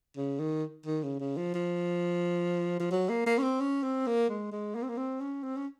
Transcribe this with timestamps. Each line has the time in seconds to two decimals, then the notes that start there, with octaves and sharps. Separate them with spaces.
0.17 C#3
0.39 D#3
0.86 D#3
1.03 C#3
1.20 C#3
1.37 F3
1.54 F3
2.80 F3
2.91 F#3
3.09 A#3
3.26 A#3
3.38 C#4
3.43 C4
3.60 C#4
3.83 C4
4.06 A#3
4.29 G#3
4.52 G#3
4.75 A#3
4.82 C4
4.89 A#3
4.97 C4
5.20 C#4
5.43 C4
5.57 C#4